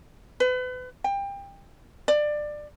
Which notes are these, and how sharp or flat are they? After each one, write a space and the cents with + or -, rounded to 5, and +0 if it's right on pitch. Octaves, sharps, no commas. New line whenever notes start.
B4 +35
G5 +25
D5 +20